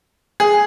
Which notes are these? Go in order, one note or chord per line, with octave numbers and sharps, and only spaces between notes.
G#4